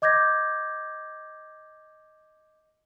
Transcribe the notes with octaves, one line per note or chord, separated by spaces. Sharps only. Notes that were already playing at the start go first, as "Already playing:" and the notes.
D#5 D6 G6 G#6 A#6